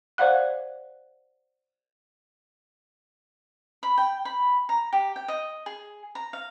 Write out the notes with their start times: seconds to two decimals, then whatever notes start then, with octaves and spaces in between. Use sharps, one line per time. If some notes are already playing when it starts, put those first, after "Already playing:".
0.18 C5 D5 F5 F#5 F#6
3.83 B5
3.97 G5
4.25 B5
4.69 A#5
4.93 G4
5.16 G5
5.28 D#5
5.66 G#4
6.15 A#5
6.33 F5